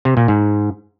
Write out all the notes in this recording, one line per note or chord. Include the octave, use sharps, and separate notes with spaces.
C3
A#2
G#2